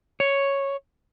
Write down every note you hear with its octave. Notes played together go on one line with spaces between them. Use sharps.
C#5